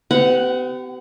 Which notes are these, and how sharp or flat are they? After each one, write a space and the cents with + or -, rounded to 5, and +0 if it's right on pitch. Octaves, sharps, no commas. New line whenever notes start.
B3 +45 G4 -30 F#5 +0